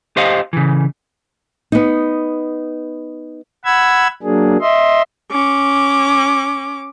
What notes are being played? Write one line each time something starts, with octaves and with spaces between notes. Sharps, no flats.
G4 C5 D#5 F5
C#3 E3
B3 D#4
F#5 B5 E6 G#6
F#3 A#3 D4 G#4
D#5 E5 C6
C#4 D6